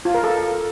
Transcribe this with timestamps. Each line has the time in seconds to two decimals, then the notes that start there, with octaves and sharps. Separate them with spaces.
0.05 F4
0.14 A#4
0.24 A4